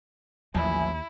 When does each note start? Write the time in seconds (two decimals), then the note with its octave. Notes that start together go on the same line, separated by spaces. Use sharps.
0.55 A1 D#2 F3 F#3 E4 E5 G#5